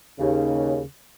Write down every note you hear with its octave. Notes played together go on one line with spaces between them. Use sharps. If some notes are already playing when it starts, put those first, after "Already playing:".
D#2 C#3